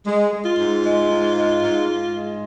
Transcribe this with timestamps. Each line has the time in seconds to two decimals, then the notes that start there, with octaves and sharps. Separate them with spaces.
0.07 G#3
0.33 G#3
0.46 F4
0.58 G#2
0.84 G#3
1.11 G#2
1.35 G#3
1.62 G#2
1.87 G#2
2.13 G#3